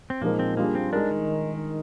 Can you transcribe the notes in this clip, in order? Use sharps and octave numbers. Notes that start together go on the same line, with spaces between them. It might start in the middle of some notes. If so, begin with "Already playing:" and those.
C4
A#2 F3 G#3 A#3 D#4 A#4
C4
G3 A#3 D4 F4 G#4
C4
G#3 D4 D#4 A#4
D#3